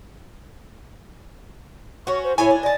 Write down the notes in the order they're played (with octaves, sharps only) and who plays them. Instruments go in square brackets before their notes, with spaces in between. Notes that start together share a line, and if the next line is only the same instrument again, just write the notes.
[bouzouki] C#4 F#4 [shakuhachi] C#6
[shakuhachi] C5
[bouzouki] A2 C#5 [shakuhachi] E4 [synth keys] G#5
[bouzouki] D4
[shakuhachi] D5 [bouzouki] D#5 A5